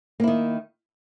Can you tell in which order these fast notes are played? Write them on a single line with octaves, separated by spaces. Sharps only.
A#3 E4 D#3